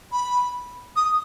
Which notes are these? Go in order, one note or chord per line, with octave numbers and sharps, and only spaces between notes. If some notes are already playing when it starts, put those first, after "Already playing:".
B5
D#6